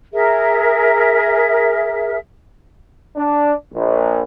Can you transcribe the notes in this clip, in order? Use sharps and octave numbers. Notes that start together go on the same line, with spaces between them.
G#4 A#4 E5
D4
A#1